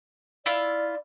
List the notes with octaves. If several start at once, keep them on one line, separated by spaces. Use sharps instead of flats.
E4 F4 D5